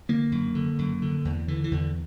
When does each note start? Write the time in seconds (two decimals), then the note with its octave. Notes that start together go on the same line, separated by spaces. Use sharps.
0.09 D3 A#3
0.32 F#2
0.55 D3
0.79 F#2
1.02 D3
1.25 E2
1.48 D3 E3
1.64 E3
1.71 E2 D3